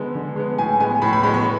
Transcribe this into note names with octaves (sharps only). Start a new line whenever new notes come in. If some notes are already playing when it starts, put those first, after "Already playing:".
Already playing: D3 G#3 B3
D3
G#3 B3
A2 G#5
G#3 B3 G#5
A2 B5
B5
G#3 B3 B5
C#6